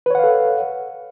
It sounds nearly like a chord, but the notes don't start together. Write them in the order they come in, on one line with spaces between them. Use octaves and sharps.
B4 C#5 F#5 F5 A4